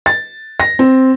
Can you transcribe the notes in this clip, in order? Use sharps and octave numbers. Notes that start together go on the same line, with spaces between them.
A6
A#6
C4